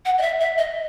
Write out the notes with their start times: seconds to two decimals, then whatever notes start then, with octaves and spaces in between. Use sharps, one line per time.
0.05 F#5
0.18 D#5
0.22 E5
0.41 E5
0.58 D#5